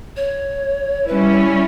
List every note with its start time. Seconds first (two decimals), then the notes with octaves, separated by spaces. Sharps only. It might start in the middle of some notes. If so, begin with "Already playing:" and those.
0.17 C#5
1.08 G3 C#4 E4 B4
1.31 C#5